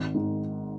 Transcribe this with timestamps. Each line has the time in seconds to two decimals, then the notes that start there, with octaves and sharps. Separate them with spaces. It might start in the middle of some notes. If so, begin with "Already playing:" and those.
Already playing: G#1
0.14 G#2 D#3